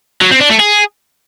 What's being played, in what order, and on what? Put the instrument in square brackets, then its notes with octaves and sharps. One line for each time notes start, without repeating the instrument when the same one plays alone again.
[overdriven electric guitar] F#3
C4
D4
A3
G#4